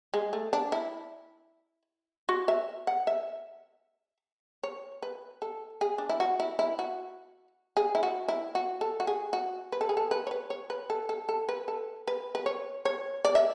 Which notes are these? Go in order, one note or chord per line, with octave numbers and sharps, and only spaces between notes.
G#3
A3
D4
E4
F#4
E5
F#5
E5
C#5
B4
A4
G#4
D4
E4
F#4
E4
E4
F#4
G#4
E4
F#4
E4
F#4
A4
F#4
G#4
F#4
B4
A4
G#4
A4
B4
C#5
B4
C#5
B4
A4
A4
A4
B4
A4
B4
B4
C#5
C#5
D5
E5